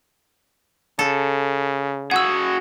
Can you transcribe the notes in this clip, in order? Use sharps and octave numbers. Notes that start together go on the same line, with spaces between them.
C#3 A4
F#4 G#4 F#5 E6